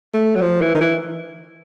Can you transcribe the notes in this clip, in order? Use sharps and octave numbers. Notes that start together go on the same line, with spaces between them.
A3
F#3
F3
E3
D#3
E3